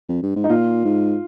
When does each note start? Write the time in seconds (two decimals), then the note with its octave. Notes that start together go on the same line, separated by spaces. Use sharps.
0.09 F2
0.23 G2
0.36 G#2
0.44 D#4
0.49 A#2 F4
0.85 G#2